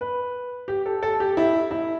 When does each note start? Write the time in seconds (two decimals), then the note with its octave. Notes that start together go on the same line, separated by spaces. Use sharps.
0.01 B4
0.68 G4
0.86 A4
1.03 A4
1.20 G4
1.37 E4
1.71 E4